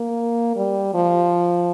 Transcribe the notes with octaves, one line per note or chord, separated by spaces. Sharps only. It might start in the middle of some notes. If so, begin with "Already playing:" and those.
Already playing: A#3
G3
F3